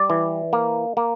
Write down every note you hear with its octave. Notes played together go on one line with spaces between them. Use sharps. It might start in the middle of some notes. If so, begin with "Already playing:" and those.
Already playing: G3 D5
E3
A#3
A#3